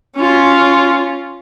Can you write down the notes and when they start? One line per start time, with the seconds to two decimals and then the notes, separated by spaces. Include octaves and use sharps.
0.16 C#4 F4